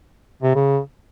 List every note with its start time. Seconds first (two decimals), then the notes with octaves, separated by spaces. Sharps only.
0.43 C3
0.56 C#3